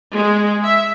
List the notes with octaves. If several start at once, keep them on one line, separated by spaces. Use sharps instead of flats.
G#3
E5